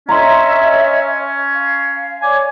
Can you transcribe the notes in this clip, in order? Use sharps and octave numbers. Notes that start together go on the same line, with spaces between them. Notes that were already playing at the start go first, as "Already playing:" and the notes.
C#4 C#5 D#5 E5 A#5 C6
F5
C#5 D5 G#5 D6